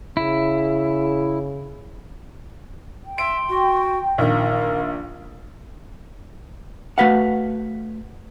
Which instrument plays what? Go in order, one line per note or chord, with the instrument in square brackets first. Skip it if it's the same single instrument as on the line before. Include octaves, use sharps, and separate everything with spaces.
[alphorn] C#3 [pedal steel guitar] E4
[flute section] G5
[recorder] E5 [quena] C6 [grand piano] D7
[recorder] F#4
[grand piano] A#1 D#3 [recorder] A#4 [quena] F5
[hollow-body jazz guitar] A3 F#4 B4 F5 F#5